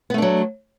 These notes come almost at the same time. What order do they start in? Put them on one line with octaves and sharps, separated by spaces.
B3 A3 D4 F#3